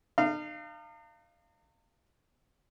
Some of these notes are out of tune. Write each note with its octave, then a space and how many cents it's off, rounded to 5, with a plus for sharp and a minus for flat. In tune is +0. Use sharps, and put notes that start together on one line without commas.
D#4 -45 F5 -20